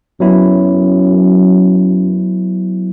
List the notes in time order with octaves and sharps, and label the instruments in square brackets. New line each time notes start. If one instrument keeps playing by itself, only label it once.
[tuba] F#2 [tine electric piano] F#3 B3 E4